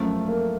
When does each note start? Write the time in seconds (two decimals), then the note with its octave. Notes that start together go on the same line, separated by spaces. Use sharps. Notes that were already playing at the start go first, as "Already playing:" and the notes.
Already playing: F#2 F3 A3
0.28 A#3